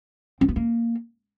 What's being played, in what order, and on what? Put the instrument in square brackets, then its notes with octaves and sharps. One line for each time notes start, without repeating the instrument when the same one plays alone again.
[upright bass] C4
B3
A#3